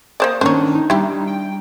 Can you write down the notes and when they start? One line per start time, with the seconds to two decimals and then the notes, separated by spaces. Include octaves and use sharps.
0.20 A#3 C5 D5 D#6
0.41 D#3 A#3 C#4 D4 C5 C#5
0.75 D#4
0.90 G3 D4 E4 G4
1.27 G5